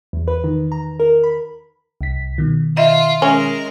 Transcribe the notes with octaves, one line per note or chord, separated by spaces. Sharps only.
E2
B4
D#3
A#5
A#4
B5
C2 B6
B2 D#3
F4 D#5 E5
G#3 C#4 A#4